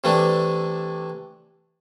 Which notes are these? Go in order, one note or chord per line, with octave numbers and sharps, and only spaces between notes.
C3 E3 A3 D4